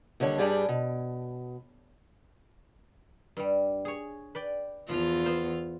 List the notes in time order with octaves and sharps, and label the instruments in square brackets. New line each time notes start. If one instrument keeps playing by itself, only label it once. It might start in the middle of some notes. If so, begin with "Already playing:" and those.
[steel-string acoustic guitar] D#2 D3 G3 C#5
G2 G3 D4 G4 G#4 D5
B2
[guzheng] G2 G3
G#4 C#5
B4 D5 G5
[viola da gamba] E2 F4 [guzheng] F3
[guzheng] B3 C5 F5